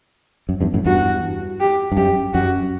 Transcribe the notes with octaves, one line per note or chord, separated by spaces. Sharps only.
F#2
E2 G2
F#2 A2
E2 G2 F#4
G4
G2
F#2 G4
F#2 F#4